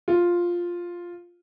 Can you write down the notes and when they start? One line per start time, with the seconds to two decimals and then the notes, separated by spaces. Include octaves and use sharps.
0.08 F4